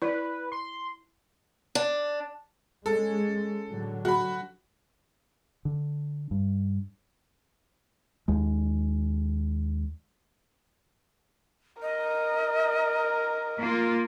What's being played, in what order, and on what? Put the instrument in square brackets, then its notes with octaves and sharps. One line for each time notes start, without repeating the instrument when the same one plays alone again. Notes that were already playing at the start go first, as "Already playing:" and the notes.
[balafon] E4 D5 [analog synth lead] B4
[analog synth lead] C6
[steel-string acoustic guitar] D4
[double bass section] G#3 C#4 [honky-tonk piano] A4
[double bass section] A2 D3 F#3
[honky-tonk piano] F#4 B5
[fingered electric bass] D3
G2
D#2 G#3
[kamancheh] A#4 [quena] D#5
[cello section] A#3 F4